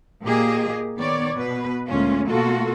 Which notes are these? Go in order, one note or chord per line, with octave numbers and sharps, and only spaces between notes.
A#2 A#3 G4 G#4 D#5
D#3 B3 C#5 D5
B2 B4
D2 A#2 G#3 C#4 F4
B2 A3 A#3 F4 F#4 A4